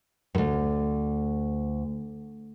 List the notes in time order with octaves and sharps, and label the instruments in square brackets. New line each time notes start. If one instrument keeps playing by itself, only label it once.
[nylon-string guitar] D2 G2